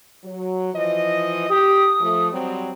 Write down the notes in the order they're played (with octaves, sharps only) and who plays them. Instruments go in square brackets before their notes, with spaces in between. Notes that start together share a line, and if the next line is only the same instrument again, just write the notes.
[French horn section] F#3
E3 F3 D#5
[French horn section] G4 [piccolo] D#6
[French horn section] F3 A3
F#3 G3 C4